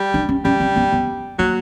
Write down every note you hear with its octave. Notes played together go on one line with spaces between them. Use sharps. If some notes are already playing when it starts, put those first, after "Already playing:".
Already playing: G3
D4
C#4
G3 C#4
C4
B3
B3
F#3 A#3